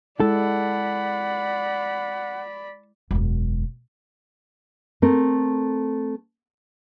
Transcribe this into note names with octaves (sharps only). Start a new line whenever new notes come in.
G#3 E4 A4 D5 F#5 B5
E1 F#2
A3 C4 A#4